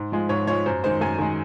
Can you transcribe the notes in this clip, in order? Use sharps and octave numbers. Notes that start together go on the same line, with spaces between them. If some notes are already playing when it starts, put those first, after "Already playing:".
Already playing: G#2
F3 G#3
G#2 C#5
F3 G#3 C#5
F#2 C5
D#3 G#3 C5
F#2 G#5
D#3 G#3